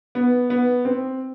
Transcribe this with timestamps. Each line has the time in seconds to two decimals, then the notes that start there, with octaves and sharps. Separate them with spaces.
0.15 B3
0.50 B3
0.85 C4